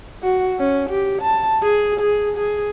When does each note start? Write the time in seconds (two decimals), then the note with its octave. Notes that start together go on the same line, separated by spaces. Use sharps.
0.23 F#4
0.59 C#4
0.90 G4
1.22 A5
1.62 G#4
2.00 G#4
2.37 G#4